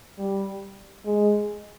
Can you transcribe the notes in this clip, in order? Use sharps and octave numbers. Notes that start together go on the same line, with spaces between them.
G3
G#3